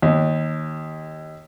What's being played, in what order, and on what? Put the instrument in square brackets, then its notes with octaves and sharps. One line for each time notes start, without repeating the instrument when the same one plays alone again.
[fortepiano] D#2